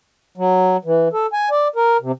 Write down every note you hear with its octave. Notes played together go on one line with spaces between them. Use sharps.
F#3
E3
A4
G#5
D5
A#4
C3